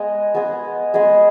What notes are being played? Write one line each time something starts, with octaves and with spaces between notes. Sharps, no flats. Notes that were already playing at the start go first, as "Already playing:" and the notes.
Already playing: G#3 B3 G#4 D#5
G#3 B3 G#4 D#5
G#3 B3 G#4 D#5